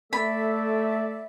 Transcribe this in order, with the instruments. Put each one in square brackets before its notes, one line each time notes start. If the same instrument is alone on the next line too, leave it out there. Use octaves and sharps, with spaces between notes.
[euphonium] A3 [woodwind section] A4 D5 E5 [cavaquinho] B5